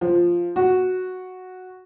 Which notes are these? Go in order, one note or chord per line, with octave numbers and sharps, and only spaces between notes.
F3
F#4